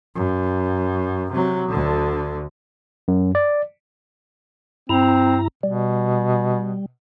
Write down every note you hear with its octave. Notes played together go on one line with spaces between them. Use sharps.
F#2
C3 F#3
D2 D3
F#2
D5
G2 C4 E4 A#5
B2 G3